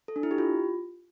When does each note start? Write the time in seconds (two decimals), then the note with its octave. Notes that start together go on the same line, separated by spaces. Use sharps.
0.08 A4
0.16 D4
0.23 E4
0.31 G4
0.38 F4